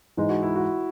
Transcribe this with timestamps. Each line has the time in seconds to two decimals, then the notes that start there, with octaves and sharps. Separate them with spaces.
0.17 G#2 E3 G#3 D#4
0.29 F#4
0.43 E4
0.56 F#4